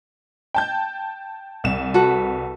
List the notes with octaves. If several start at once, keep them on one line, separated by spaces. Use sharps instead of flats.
G5 A5 G6
C2 E7
F#4 A4 B4